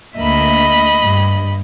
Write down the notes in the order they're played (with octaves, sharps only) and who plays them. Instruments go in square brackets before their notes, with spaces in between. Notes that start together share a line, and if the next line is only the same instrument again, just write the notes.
[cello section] D2 A#3 E5 [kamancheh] D#5 B5
[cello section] G2